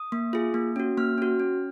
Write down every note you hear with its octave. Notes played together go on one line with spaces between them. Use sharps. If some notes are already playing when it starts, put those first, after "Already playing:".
Already playing: D#6
A#3
F4 G#4
A#3
C#4 F#4
A#3 F6
C#4 F#4
C#4